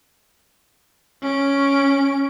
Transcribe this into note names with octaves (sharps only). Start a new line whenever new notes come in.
C#4 D7